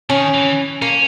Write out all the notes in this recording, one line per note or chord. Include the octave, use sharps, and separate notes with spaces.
D#3 C#4
E3
A#3 C#4